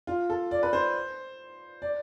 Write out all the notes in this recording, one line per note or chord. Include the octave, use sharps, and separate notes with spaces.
F4
A4
D5
B4
C5
D5